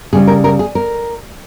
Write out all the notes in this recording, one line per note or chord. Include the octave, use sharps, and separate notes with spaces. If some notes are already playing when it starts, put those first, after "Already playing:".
C#3 G3 G#4
A#4
A#4
G#4
A#4